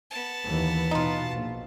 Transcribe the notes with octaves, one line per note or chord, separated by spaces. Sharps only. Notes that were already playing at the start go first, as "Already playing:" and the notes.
B3 A5
D#2 E3
B2 D#4 F4
A#1